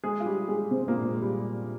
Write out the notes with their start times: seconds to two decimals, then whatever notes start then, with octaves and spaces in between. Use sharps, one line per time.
0.04 G#3 G#4
0.20 F4
0.26 G3 G4
0.48 G#3 G#4
0.71 C3 C4
0.82 C4
0.88 A#2 A#3
1.05 G#3
1.22 G3